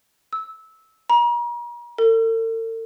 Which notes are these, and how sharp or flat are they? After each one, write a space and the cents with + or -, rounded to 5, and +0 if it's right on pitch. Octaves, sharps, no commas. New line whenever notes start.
E6 -15
A#5 +40
A4 +45